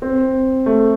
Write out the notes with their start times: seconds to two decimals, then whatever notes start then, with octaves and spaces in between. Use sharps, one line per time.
0.02 C4
0.66 A3